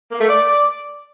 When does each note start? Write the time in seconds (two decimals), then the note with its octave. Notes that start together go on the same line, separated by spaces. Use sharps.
0.12 A#3
0.20 A3
0.28 D5